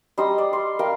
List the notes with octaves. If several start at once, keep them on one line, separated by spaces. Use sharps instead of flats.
G3 D#4 C6 D#6
D5
C6
A#4 F5 G5